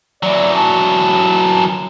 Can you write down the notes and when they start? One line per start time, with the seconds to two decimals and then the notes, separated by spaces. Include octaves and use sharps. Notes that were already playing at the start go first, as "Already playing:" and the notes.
0.23 E3 F#3 D5
0.56 A5